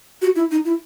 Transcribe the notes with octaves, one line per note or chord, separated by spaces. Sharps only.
F#4
E4
D#4
E4